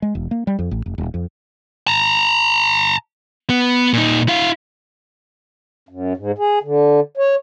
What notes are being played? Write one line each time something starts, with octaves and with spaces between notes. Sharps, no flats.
G#3
E1
A#3
G3
F2
A1
F1
D#1
F2
A5 A#5
B3
A#2 D#4
E4 F5
F#2
G#2
G#4
D3
C#5